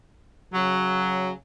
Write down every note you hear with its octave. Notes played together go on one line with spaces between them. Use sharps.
C#3 F#3